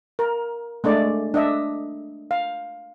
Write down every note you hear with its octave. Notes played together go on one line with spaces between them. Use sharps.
A#4
G#3 A3 D4 D5
D4 D#5 E5
F5